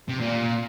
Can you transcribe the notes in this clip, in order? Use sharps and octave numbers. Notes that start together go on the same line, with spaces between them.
C3
A#2